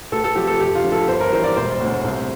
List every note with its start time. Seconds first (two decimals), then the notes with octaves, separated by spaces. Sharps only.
0.12 D2 A4
0.24 A4
0.35 C3 F3 G4
0.47 A4
0.60 F1 G4
0.75 F4
0.84 F2 D3 F3
0.92 A4
1.07 G1 C5
1.20 A#4
1.32 G2 E3 C5
1.44 D5
1.56 E1 C5
1.81 D2 D3
2.04 C2